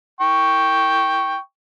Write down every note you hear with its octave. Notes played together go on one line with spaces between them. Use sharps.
G5 C#6